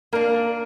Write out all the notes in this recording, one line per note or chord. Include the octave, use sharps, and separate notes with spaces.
A#3 D4 A#4